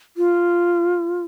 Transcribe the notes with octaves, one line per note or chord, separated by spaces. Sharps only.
F4